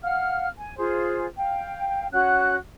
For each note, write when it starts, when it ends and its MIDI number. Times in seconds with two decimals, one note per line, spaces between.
0.02 0.48 77
0.02 0.48 78
0.02 0.48 89
0.57 0.74 80
0.77 1.26 65
0.77 1.26 68
0.77 1.26 72
1.37 2.07 77
1.37 2.07 79
2.13 2.56 61
2.13 2.56 66
2.13 2.56 78
2.13 2.56 90